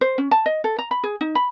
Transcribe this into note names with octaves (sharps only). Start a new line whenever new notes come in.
C5
C#4
A5
D#5
A4
A#5
B5
G#4
D#4
B5